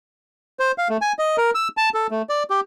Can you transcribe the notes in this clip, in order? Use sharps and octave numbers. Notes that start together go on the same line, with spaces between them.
C5
F5
A3
G#5
D#5
A#4
E6
A5
A4
A3
D5
G4